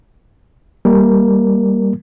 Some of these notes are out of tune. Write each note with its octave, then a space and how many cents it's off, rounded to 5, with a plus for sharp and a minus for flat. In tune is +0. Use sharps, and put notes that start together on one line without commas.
G3 +0 A#3 +0 A#4 +0